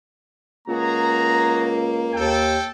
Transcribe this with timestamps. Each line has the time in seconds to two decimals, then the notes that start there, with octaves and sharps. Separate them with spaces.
0.68 C#2 A#3 F#4 G#4 A#5
2.14 D#2 A4 G5